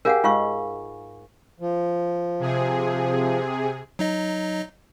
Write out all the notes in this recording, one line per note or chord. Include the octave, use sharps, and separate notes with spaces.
G4 G#4 A#4 F5 F#5
G#2 F4 F5 C#6
F3
C3 G#4
F#3 D#4 D#5